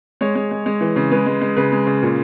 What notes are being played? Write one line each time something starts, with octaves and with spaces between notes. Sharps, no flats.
G#3 C#5
G#3
G#3
G#3
E3
C#3
G#3 B4
G#3
G#3
C#3 B4
G#3
C#3
A#2